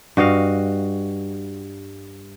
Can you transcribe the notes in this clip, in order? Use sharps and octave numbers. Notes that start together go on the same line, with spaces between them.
G2 F#4 D#5 F5